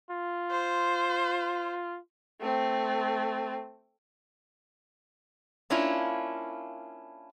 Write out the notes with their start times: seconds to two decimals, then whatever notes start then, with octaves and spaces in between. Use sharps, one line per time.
0.11 F4
0.51 C5
2.41 A3 C4
5.70 A#3 C#4 D4 E4 F4